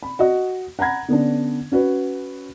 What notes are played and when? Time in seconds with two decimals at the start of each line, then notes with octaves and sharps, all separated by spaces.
0.03 B5
0.19 F#4 D#5
0.79 F#5 A#5 B5 G#6 A#6
1.08 D3 B3 C#4 D4
1.72 C#4 F#4 B4